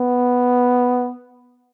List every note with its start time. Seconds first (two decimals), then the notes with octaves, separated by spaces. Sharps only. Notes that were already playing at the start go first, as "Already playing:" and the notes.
Already playing: B3